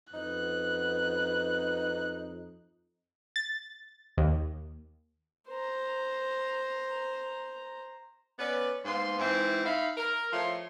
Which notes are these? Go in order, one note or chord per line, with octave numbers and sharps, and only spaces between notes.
F2 C#4 D#4 F#4 B4 F#6
A6
D#2
C5 A#5
B3 C#4 B4 D5
G#2 A#3 B3 C6
G#2 E3 C4 E4
D#4 E5 F5 B5
A#4
F3 A3 E4 C#5 C6